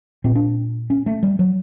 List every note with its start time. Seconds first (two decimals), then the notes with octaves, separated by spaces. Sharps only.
0.24 A#2 C4
0.35 D4
0.90 C#4
1.06 A3
1.23 G3
1.39 F#3